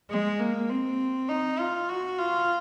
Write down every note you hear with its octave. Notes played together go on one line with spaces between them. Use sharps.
G#3
A#3
C4
D#4
F4
F#4
F4